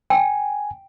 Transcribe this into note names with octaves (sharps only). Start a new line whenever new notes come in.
G5 G#5